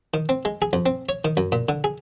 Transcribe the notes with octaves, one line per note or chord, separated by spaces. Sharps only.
D#3
C4
G#3
G#4
F2
C4
C#5
D#3
F#2
A#2
D3
G#4